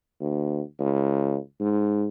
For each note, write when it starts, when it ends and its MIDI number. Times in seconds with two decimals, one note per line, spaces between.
0.20 0.61 38
0.80 1.37 37
1.60 2.08 44